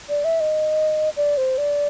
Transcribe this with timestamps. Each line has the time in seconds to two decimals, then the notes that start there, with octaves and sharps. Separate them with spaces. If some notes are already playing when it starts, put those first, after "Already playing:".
0.09 D5
0.25 E5
0.40 D#5
1.17 D5
1.37 C5
1.58 D5